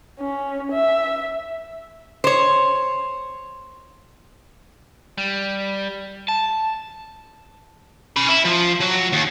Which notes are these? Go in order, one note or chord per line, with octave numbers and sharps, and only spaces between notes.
C#4
E5
C5 C#5
G3
A5
C#4 B5
E4
F3
F#3
D#2